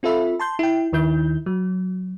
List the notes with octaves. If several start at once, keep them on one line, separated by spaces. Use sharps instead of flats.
C4 F4 A4 E5 B5
A5 C6 G6
E4 G5
D#2 D#3 E4 G6
F#3